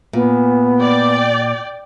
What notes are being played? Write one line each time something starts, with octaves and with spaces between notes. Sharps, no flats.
A#2 B3
D5 G5